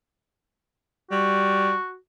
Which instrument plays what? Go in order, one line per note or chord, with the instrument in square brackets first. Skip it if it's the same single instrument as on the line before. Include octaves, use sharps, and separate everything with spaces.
[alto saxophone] G3 [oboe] F#4